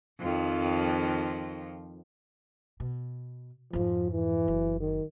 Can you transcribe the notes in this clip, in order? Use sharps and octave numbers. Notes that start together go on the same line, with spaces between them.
F2 D#3 F3
B2
F2 G#2 F3
E3
F#1
D#3